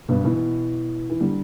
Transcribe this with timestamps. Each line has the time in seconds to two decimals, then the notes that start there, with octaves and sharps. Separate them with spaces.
0.09 G2 B2
0.25 B2 E3
1.10 E3
1.20 D3 G3